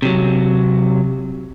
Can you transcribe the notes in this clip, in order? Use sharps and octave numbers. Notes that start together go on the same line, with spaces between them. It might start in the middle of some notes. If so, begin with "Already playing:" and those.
C3 F#3